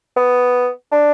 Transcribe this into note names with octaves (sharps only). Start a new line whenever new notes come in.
B3
D4